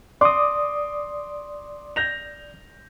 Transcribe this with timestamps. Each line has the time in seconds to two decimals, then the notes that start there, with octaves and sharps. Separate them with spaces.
0.21 D5 C6 D6 D#6
1.96 G6 A#6 F7